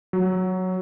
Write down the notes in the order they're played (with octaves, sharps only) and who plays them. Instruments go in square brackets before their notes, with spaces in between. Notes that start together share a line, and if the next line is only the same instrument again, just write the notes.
[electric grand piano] F#3